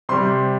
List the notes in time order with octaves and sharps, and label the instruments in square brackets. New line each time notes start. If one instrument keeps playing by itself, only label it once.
[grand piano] C3 G3 C6